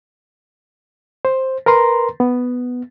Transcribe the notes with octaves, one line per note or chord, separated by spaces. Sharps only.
C5
A#4 B4 A#5 C6
B3